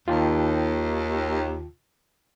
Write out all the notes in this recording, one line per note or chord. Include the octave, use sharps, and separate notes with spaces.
D#2 F4 G5 A5